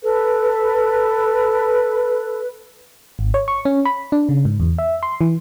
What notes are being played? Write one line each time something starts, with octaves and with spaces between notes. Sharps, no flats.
A4 B4
G#1
C#5
C#6
C#4
B5
D4
C#3
G#2
E2
E5
C6
E3